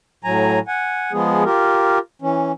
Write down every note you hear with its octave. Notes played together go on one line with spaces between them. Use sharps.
A2 F#3 G#5 A#5
F#5 G#5
F3 G#3 B3 G#4
F4 G4 A#4
E3 C#4